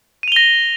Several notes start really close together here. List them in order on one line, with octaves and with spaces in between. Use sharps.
D#7 F7 G7 A#6